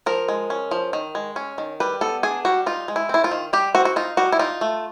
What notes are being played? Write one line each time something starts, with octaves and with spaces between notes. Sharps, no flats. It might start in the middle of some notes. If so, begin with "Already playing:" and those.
F3 A#4
G#3
C#4
F3
D#3
G#3
C#4
D#3
G3 B4
B3 A4
D4 G#4
G3 F#4
D#4 F4
G#3
E4
C4 E4
F4
D#3
G3 G4
C4 F#4
F#4
D#4 F4
G3 F#4
E4
D#4 F4
A3